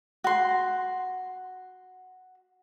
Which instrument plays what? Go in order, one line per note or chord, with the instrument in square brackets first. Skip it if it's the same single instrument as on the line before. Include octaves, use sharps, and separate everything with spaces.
[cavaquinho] F#4 C6